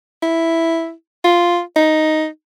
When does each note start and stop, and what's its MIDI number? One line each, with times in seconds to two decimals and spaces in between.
0.23 0.92 64
1.24 1.60 65
1.76 2.27 63